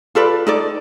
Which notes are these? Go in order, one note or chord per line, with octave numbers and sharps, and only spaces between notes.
F4 A4 B4 D5
D#4 A4 D5